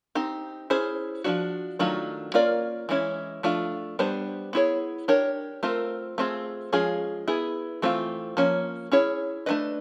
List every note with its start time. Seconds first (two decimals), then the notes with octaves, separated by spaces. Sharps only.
0.15 C4 D#4 G4
0.70 C#4 E4 G#4 C5
1.24 F3 A3 D4 F#4
1.79 D#3 F#3 A3 D4 F4
2.34 A#3 C#4 F4 A#4 D5
2.89 E3 G#3 C#4 E4
3.43 F3 A3 D4 F4
3.99 G3 B3 D4 G4 C5
4.53 B3 E4 G#4 C#5
5.08 D4 G4 A#4 C#5
5.63 A3 C4 F4 A#4
6.18 A3 C4 F4 G#4
6.73 F3 G#3 C#4 F4 G#4
7.28 B3 E4 G#4
7.82 E3 A3 C4 F4
8.37 F3 A#3 C#4
8.92 C#4 E4 G#4 C#5
9.46 A3 D4 F#4 B4 D#5